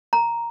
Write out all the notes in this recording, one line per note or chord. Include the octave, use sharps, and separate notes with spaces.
A#5